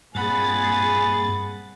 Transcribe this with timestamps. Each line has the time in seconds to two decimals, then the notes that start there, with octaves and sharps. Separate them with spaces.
0.15 G2 A#2 C4 G#4 F#5 G#5 B5 A6